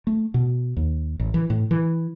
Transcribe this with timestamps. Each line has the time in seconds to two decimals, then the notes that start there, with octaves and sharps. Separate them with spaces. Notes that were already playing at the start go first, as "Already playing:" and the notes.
0.07 A3
0.34 B2
0.77 D#2
1.20 A1
1.34 E3
1.50 A2
1.71 E3